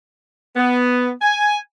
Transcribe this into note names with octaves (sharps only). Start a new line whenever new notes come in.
B3
G#5